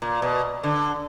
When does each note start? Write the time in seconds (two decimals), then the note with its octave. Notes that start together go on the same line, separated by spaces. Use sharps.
0.02 A#2
0.22 B2
0.63 D3